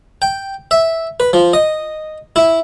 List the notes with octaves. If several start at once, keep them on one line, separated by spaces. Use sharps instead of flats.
G5
E5
B4
F3
D#5
E4